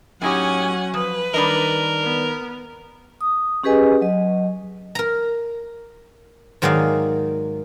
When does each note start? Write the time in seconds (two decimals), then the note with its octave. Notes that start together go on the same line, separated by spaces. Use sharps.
0.22 A2 F#3 C#4 D#4 G4 F#5 G#5
0.94 F3 B4
1.34 D#3 G3 D4 A#4 D#5
2.04 B3
3.21 D#6
3.63 C#4 G4 G#4 B4 D#5 G#5
4.01 F#3 D#5
4.95 A#4 A#5
6.62 G#2 D#3 F#3 G#4 D5 F5